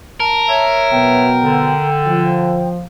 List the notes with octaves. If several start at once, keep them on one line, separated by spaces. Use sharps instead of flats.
A#4 A5
C#5 E5
B2 F#3 B3 G5
D3
F3